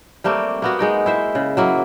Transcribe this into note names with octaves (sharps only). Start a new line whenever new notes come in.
G3 A3 A#3 C4
A#3 B3 F#4
G#3 D#4 G5
E4 C5 E5
C#3
F#3 A#3 E4